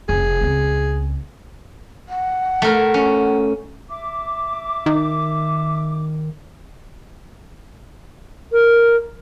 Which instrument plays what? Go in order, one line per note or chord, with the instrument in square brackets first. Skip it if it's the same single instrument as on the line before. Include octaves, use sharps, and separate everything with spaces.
[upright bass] F1 [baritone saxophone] G#4
[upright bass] C#2 C4
[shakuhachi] F#5
[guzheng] A3 A#4
C#4
[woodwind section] E5 D6
[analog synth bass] D#3
[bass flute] A#4